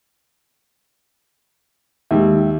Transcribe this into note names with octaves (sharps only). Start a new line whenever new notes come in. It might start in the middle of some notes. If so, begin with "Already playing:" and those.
D#2 G#3 G4 E5